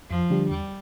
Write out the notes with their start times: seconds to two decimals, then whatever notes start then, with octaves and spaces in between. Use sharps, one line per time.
0.10 F2 F3
0.30 D3 G3 D4 G4
0.50 E2 G3